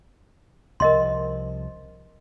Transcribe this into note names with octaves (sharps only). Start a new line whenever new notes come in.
C2 F3 A#4 D#5 C6